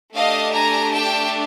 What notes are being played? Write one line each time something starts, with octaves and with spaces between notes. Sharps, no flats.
A3 D4 G4 D#5 F5
G#5 A#5
G5 A5